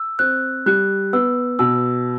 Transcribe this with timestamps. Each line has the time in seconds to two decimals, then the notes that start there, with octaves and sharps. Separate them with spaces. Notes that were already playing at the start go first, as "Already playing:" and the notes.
Already playing: E6
0.19 C4 F#6
0.66 G3 F#6
1.13 B3 E6
1.59 B2 E6